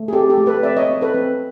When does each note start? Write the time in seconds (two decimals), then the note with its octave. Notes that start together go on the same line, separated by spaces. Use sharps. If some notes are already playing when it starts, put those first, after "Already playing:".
Already playing: A3
0.08 G#4
0.13 C4 G4 A4
0.30 G4 A4
0.38 A3
0.46 A4 B4
0.63 C4 D5 E5
0.77 C#5 D#5
0.90 C4
1.01 A4 B4
1.15 C4